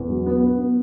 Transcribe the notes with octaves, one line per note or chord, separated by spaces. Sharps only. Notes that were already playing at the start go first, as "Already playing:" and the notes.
Already playing: E2
F#3
B3
B3
B3